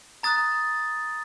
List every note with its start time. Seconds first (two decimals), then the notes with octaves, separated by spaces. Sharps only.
0.23 A#5 D#6 F#6 A6